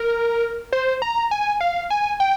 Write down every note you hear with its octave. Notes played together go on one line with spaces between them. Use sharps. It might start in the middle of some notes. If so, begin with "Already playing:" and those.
Already playing: A#4
C5
A#5
G#5
F5
G#5
G5